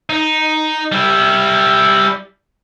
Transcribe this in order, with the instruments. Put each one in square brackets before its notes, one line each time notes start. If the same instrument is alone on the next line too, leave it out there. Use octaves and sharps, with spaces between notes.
[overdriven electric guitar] D#4
G3 E4